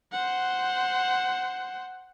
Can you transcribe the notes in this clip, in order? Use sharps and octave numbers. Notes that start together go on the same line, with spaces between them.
C5 F#5